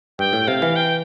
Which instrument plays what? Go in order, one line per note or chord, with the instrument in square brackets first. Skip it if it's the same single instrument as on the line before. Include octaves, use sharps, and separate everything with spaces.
[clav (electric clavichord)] G2 [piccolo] G5
[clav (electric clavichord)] A2
[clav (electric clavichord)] C3 [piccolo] F5
[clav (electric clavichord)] E3
[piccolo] G5